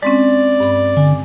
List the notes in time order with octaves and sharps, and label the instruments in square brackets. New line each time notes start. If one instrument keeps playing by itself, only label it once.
[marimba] G#3 C4 C#4 [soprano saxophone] D5
[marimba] G2 B5
[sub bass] D3 [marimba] G#5